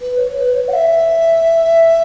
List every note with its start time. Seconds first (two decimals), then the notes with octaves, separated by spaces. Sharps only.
0.01 B4
0.17 C#5
0.34 B4
0.51 C#5
0.68 F#5
0.73 E5